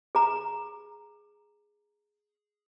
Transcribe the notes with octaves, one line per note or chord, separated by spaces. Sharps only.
G#4 A#5